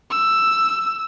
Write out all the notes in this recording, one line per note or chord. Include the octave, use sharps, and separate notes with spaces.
E6